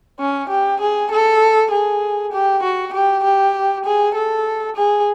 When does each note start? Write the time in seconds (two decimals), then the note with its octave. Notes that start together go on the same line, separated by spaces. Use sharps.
0.19 C#4
0.49 G4
0.80 G#4
1.11 A4
1.71 G#4
2.32 G4
2.63 F#4
2.93 G4
3.23 G4
3.85 G#4
4.15 A4
4.76 G#4